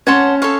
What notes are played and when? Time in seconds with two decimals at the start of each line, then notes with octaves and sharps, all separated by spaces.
0.07 C#4 C#5 F#5 A5 C6
0.42 A4 C#5 F5